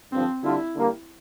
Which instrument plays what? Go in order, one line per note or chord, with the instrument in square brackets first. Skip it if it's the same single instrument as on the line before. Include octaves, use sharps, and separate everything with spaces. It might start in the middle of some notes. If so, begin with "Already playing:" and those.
[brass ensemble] G2 D3 F3 [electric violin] C4
[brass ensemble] D3 G3 D4 F4 [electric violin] E4
[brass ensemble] D3 G3 A#3